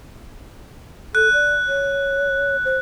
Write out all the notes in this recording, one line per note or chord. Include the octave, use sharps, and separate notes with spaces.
A4 F#6
D5
C#5
C5